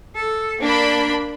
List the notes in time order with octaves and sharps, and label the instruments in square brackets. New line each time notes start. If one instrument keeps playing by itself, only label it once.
[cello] A4
[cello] A#3 [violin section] D4 B5